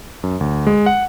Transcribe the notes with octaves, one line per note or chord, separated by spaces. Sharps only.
F#2
D2
G#3
F#5